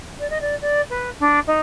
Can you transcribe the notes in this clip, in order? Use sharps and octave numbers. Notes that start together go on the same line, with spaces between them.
D5
D#5
D5
D5
B4
D4
D#4